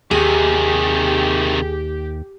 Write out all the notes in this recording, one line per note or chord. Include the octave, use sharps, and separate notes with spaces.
D#2 C3 D#3 G4 G#4